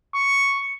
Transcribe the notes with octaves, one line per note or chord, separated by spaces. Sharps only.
C#6